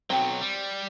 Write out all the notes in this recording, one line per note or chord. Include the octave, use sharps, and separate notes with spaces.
B1 F#3 C4
G3